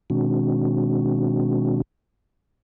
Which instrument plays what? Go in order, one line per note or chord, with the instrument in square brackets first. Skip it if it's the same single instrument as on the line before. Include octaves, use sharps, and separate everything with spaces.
[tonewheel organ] B2 D#3 G#3 C4 D4 F#4